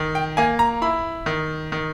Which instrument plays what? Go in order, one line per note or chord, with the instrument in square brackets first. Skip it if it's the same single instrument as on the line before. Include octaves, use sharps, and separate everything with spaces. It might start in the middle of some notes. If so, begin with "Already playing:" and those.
Already playing: [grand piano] D#3
G5
A#3 G#5
A#5
E4 B5
D#3
D#3